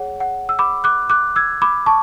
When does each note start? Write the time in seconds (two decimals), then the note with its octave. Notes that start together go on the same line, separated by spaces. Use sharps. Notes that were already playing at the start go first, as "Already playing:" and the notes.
Already playing: G#4 C#5 F#5
0.20 F#5
0.49 E6
0.59 B5 D6
0.84 D6 F#6
1.10 D6 F#6
1.36 E6 G#6
1.62 B5 D6
1.86 A5 C#6